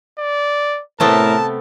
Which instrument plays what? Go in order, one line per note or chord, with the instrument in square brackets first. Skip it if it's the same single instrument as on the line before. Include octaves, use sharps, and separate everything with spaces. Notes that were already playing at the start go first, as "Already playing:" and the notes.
[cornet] D5
[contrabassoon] A2 [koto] C3 A3 B3 [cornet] A#4 [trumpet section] A5